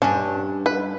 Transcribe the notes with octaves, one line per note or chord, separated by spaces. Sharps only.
G2 C#4 D4
B4